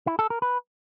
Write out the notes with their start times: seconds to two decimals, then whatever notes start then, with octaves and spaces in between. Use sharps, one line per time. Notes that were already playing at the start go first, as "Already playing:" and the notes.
0.07 E4
0.19 A4
0.30 A#4
0.42 B4